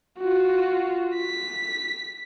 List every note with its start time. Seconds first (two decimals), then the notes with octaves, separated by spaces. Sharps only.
0.20 F4 F#4
1.16 B6